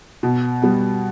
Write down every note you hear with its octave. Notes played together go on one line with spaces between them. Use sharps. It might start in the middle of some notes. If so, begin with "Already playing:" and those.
B2
G3 B3